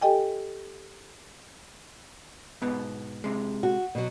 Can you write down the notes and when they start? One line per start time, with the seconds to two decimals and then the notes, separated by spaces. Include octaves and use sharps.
0.02 G4 A4 D#5 G5 G#5
2.62 G#2 B2 B3
3.24 C3 G#3
3.63 F#4
3.95 B2 F#3